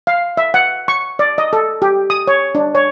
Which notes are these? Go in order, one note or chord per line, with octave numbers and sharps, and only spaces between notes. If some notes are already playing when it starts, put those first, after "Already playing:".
F5
E5
F#5
C#6
D5
D#5
A4
G4
D#6
C#5
D4
C#5